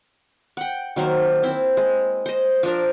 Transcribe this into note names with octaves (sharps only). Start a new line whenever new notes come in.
F#5 G5
D#3 F#3 A#3 C5
C4 E4
G#3
C5 D#5
F3 D4 A#4